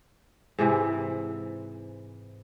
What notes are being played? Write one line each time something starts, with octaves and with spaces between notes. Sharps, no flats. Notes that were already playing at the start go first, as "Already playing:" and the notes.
G#2 C3 E3